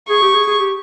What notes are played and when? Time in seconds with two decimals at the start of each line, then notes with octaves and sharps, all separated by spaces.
0.09 G#4 C#6
0.22 G4
0.34 G#4
0.47 G#4
0.59 G4